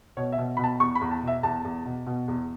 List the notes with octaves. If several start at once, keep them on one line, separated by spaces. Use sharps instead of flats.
B2 C#5
E5
B2
B2 B5
A5
E2 C#6
B5
E2
A5
B2
E5
E2 A5
E2
B2
B2
E2